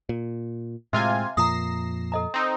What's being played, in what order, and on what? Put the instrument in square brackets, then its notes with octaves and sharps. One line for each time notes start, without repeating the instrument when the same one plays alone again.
[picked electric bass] A#2
[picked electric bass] A2 G#3 [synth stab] C3 F4 G#5 [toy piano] E5
[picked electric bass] F2 A#2 F3 [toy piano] A#5 D#6 [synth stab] A#6 C7 E7
[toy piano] A4 D#5 A#5
[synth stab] C4 D#4